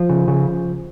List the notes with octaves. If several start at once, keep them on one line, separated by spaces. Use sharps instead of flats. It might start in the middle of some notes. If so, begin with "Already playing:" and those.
Already playing: F3
C#3
C#3